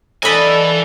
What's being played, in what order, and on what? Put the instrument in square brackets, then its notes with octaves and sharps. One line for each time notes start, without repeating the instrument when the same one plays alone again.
[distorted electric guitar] E3 G#5 [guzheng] A#3 D4 B4 [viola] A4 [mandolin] D#5 B5